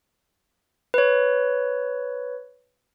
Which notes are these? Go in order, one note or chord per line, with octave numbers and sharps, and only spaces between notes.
B4 C#5